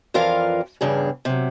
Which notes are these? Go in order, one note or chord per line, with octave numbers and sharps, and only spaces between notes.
F2 E3 F4 A#4 D5 F5
E2 G2 C#3 G#4
C3 F#3